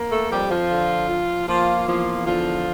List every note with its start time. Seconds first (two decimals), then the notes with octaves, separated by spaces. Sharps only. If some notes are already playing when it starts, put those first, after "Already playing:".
Already playing: A#3
0.11 A3 A4
0.31 F2 G3 G4
0.51 F3 F4
0.70 D3
1.09 F3
1.48 F3 A#3 F4
1.88 E2 F3 F4
2.27 D3 F3 F4